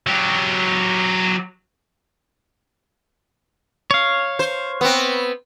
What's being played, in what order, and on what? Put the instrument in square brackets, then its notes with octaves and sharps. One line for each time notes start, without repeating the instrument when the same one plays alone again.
[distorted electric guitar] F#3 G4
[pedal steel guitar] C#5 F5
[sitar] C5
B3 C4